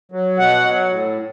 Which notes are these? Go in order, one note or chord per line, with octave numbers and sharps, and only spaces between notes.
F#3
B2 F#5
F#3
A2